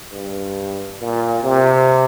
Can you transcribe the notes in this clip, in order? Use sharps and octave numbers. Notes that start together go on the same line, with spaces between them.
G2
A#2
C3